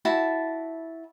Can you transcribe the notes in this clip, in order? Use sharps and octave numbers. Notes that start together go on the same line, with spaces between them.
E4 F#4 A5